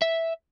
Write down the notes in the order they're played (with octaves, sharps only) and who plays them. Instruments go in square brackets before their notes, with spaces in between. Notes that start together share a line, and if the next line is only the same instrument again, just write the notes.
[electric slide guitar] E5